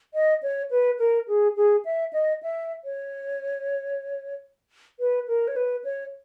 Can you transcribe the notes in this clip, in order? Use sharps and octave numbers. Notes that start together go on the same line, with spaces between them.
D#5
C#5
B4
A#4
G#4
G#4
E5
D#5
E5
C#5
B4
A#4
C#5
B4
C#5